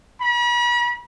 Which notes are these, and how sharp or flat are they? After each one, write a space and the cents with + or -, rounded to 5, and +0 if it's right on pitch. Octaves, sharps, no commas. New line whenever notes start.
B5 -40